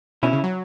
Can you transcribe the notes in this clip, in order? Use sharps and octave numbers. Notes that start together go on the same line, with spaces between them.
B2 C#4 E4
C#3
F#3